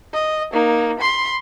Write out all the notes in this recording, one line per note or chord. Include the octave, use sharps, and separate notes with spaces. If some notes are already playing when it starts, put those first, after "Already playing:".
D#5
A#3 D#4
B5 C6